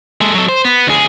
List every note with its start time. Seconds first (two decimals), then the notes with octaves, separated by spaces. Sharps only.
0.21 G#3 A4
0.34 F#3 A4
0.49 C5
0.64 B3
0.87 D2 G#4